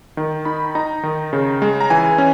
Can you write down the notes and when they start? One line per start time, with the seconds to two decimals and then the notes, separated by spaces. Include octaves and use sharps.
0.17 D#3
0.45 D#4 B5
0.75 D#4 A#5
1.03 D#3
1.33 C#3
1.62 G#3
1.81 A#5
1.90 E3 G#5
2.18 C#4